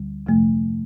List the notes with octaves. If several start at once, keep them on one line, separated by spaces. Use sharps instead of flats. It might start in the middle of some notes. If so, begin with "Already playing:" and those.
Already playing: D2 D3 G3
F2 C3 F3 A3